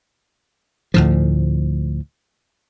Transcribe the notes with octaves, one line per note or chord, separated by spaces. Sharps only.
D2 A2 F3